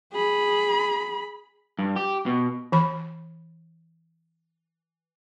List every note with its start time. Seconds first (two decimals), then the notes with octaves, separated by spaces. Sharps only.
0.13 G#4 B5
1.79 G2
1.96 G4
2.26 B2
2.72 E3 B5